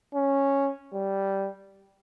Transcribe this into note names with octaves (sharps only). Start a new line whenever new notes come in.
C#4
G3